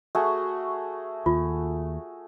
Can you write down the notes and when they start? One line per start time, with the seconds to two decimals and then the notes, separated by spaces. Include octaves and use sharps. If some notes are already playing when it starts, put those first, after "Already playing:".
0.15 A3 F#4 G#4
1.26 D#2 F4